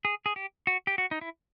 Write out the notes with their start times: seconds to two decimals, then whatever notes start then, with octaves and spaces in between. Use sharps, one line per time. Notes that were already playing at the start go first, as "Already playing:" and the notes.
0.05 G#4
0.26 G#4
0.36 G4
0.67 F#4
0.87 G4
0.98 F#4
1.11 D#4
1.21 E4